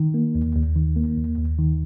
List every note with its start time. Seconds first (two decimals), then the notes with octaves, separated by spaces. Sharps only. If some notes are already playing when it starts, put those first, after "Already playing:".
Already playing: D#3
0.14 A#3
0.35 D#2
0.55 D#2
0.76 D#3
0.96 A#3
1.17 D#2
1.38 D#2
1.59 D#3